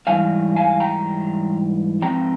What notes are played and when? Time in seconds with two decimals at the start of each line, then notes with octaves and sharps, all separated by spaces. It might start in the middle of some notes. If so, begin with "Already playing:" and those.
0.07 G#2 E3 G3 F5 G#5
0.56 F5 G#5
0.80 G5 A#5
2.02 G#2 F3 C4 G5 A#5